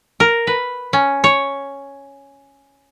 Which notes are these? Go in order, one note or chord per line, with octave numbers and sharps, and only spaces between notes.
A#4
B4
C#4
C#5